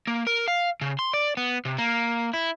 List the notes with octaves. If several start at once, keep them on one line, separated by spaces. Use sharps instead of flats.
A#3
A#4
F5
C#3
C6
D5
B3
C3
A#3
E4